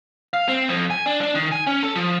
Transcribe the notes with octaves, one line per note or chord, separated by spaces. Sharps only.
F5
C4
F2
G#5
D4
D4
D#3
G#5
C#4
A4
F3